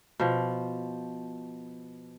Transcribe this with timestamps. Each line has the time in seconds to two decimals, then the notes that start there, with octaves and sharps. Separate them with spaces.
0.20 B2 F3